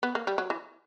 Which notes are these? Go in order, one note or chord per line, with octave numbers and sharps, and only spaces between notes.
B3
A#3
G3
F#3
E3